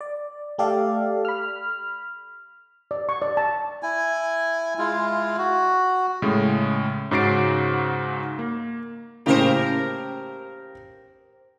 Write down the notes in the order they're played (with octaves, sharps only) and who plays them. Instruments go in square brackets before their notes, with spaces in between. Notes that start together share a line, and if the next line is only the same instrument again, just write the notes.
[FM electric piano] D5
A3 G4 A4 D5 F5
B5 F6
[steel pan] D5
C#6
D5
A5
[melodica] E4 G#5
G#3 E4 F4
F#4
[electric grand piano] A2 C#3 G#3
G#2 C#3 F#4 A6 C7 D7
A#3
[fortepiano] A2 C#3 A#3 [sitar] G4 A#4 C5